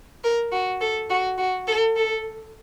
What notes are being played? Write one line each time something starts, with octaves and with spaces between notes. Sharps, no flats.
A#4
F#4
A4
F#4
F#4
A4
A4